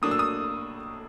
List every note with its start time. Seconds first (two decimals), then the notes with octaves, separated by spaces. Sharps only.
0.02 A2 F#3 A#3 D4 D#6
0.11 E6
0.19 D#6